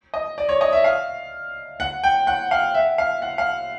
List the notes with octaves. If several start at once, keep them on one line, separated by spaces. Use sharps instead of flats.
D#5
D5
C#5
D#5
E5
F5
F#5
G5
F#5
F5
E5
F5
F#5
F5